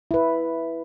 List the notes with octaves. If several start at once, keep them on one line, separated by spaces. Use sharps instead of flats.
E4 B4